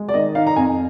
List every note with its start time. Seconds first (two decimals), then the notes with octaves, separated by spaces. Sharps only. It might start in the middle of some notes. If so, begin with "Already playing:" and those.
Already playing: G#3
0.09 D5
0.14 D#3 D#5
0.35 D#4 F5
0.47 A#5
0.56 F2 G#5